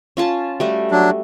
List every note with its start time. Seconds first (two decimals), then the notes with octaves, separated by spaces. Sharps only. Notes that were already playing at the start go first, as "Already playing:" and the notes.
0.17 C#4 F4 A5
0.60 G3 A3 F#4
0.91 F#3 D4